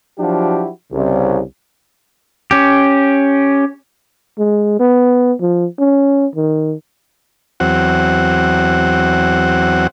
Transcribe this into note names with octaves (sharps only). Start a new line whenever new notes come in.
F3 F#3 D4 E4 F#4 G4
C2 C#3
C#4 G4
G#3
B3
F3
C#4
D#3
E2 F#3 C4 F#5